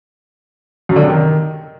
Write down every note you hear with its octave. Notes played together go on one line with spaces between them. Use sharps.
F#2
D3
C3
D#3